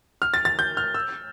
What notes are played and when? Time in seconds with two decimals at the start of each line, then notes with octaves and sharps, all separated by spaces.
0.22 F6
0.34 A6
0.45 A6
0.59 G6
0.77 F6
0.94 E6